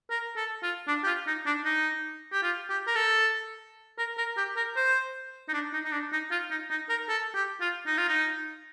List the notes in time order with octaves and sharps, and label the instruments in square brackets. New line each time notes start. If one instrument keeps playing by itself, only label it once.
[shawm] A#4
A4
F4
D4
G4
F4
D#4
D4
D#4
G4
F4
G4
A#4
A4
A#4
A#4
G4
A#4
C5
D#4
D4
D#4
D#4
D4
D#4
F4
D#4
D#4
A#4
A4
G4
F4
D#4
F4
D#4